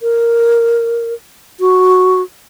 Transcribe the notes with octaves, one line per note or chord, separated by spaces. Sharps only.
A#4
F#4